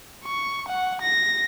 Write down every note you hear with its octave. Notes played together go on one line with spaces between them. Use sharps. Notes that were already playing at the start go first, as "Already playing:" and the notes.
C#6
F#5
A#6